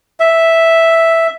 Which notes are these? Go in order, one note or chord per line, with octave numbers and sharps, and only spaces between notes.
E5